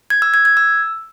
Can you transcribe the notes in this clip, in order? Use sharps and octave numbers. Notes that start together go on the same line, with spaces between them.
G#6
E6
G#6
G#6
E6